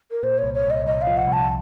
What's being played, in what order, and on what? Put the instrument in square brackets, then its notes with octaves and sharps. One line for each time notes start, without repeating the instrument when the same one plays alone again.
[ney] A#4
[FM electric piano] A#2 [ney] C5
[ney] C#5
[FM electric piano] C2
[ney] C#5
[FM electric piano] C2 [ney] D#5
[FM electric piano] C2 [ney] D#5
[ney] F5
[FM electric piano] F3
[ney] F#5
[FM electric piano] C2
[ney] A5